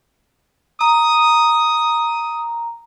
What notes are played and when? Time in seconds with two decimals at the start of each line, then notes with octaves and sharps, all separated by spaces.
0.81 A#5 D#6